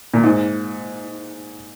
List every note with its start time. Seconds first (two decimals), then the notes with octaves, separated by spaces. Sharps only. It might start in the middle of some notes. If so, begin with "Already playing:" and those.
0.14 A#2
0.24 G#2